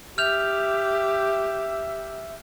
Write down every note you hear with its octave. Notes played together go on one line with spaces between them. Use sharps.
G4 E5 F6 G6 F7